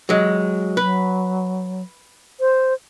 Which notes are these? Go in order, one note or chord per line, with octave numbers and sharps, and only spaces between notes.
F#3 G#3
F#3 B4
C5